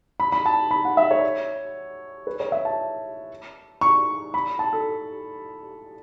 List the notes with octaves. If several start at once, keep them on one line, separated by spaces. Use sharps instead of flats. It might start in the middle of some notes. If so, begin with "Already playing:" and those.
B5
B5
A5
B5
F#5
E5
C#5
B4
C#5
E5
A5
C#6
B5
A5
A4